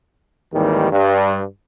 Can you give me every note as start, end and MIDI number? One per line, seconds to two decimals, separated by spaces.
0.53 0.88 32
0.53 0.88 39
0.53 0.88 51
0.53 0.88 52
0.53 0.88 55
0.91 1.43 43